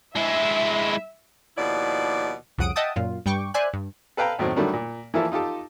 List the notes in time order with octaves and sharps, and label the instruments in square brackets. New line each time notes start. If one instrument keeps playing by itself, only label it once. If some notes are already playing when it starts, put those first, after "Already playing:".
[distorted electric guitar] G#3 E4 [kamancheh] E5
[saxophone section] D#2 B2 F3 E4 D5
[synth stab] C2 F2 C#3 F#5 D#6 D7
D#5 E5 F#5 G5 A5 D#6
F#2 A#2 F4
G2 G3 G5 C#6 D6
C5 D5 E5 G#5 F#6
G2
[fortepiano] A4 B4 F5 G5 A#5
D#2 A2 F#3 C4
D3 D#3 F#3 G3 A3
A#2
E3 F3 A#3 E4 F4 A4
D#4 F4 G4 A4